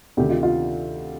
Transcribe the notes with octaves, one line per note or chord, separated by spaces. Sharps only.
D2 C3 D#3 G4
F4
F4